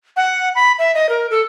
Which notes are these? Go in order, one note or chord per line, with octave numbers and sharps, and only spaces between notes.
F#5
B5
E5
D#5
A#4
A4